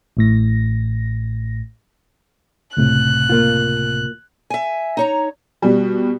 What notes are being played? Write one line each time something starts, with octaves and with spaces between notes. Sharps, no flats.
A1 A2 A#6
C#2 A2 C3 F#6
A#3 F4
E5 G#5
D#4 C#5 A#5
B2 G3